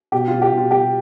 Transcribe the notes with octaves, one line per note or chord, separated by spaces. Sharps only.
B2 G4
B2 F4
G4
B2 F4
B2 G4